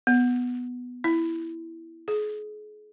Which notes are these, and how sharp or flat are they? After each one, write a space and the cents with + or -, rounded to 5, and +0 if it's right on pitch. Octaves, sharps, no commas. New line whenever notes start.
B3 +0
E4 +0
G#4 +35